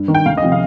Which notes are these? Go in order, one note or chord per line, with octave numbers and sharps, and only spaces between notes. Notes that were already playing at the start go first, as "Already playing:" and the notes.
Already playing: G2
D#3
G5
D2 F5
D#5
C3 F3
F5